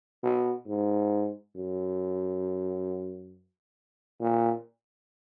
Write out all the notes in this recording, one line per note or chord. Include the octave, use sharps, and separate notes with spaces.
B2
G#2
F#2
A#2